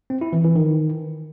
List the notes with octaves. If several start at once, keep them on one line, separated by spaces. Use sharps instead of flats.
C4
E4
E3
E3
D#3